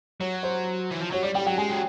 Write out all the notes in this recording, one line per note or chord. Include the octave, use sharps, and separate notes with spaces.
F#3 C#5
C5
E3
F3
F#3 C#5
G3 D5
G3 G5
F#3 G5
G#3 G#5
F#3